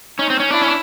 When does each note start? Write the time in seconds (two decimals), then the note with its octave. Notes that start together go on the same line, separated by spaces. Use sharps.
0.19 C#4 D#4
0.30 C4
0.40 C#4
0.50 D4 E4
0.62 C#4
0.67 D4